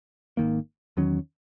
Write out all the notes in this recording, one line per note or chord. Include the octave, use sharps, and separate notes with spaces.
G#1 F#2 D#3 A#3
E2 D#3 F#3 C#4